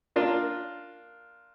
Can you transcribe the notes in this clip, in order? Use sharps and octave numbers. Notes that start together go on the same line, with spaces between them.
A#3 D4 F4